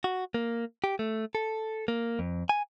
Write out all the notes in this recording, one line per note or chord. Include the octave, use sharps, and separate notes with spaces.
F#4
A#3
G4
A3
A4
A#3
F2
G#5